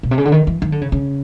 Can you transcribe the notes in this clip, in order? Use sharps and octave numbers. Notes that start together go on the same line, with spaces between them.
B2
C3
C#3
D3
D#3
E3
D#3
D3
C#3
C#3